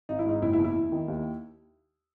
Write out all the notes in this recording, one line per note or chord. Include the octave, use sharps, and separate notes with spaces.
G#1 D#4
E4
G#2 D#4
F#1 E4
E4
E2
E4
E2
D#3
D#2